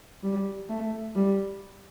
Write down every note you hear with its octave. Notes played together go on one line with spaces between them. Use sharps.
G3
A3
G3